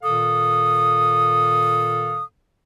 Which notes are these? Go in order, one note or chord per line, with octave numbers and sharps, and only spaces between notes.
A#2 D#3 A4 F5 D#6